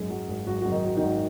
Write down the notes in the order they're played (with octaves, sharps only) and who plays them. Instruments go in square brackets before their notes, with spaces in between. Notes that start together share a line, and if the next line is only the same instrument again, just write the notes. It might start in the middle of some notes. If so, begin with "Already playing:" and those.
Already playing: [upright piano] G#1 F#2 G#3 G#4
F#3
G#1
G#1 F#3 F#4
F#2 F#4
D#3 D#4
F#3
D#3 D#4
G#1